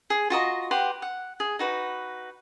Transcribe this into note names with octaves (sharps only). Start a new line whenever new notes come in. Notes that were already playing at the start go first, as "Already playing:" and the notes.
G#4
F4 F#4 D#5 A#5
G4 B4 F#5 C6
F#5
G#4
D#4 F#4 B4